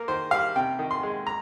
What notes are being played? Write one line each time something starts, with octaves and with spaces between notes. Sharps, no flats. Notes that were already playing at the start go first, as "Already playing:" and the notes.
Already playing: A#3 A#4
D#3 C5
G3 F5
C3 G5
D#3
C6
G#3
A#5